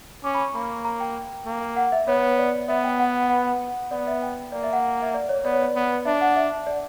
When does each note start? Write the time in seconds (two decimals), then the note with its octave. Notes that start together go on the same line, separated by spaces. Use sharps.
0.24 C#4 D6
0.34 B5
0.40 C#6
0.55 A#3 B5
0.85 A#5
1.00 G5
1.46 A#3
1.77 F#5
1.92 E5
2.07 B3 C#5
2.38 D5
2.69 B3 E5
2.84 G5
2.99 F#5
3.30 F#5
3.91 B3 D5
4.07 E5
4.22 G5
4.52 A#3 D5
4.63 E5
4.73 F#5
5.02 E5
5.14 D5
5.29 C#5
5.44 B3 D5
5.53 C#5
5.62 D5
5.76 B3
6.05 D4 E5
6.21 F#5
6.36 E5
6.67 D5